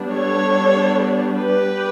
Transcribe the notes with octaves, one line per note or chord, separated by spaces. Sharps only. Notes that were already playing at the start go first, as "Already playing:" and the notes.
Already playing: G3 B3 D4
A4 C#5
G4 B4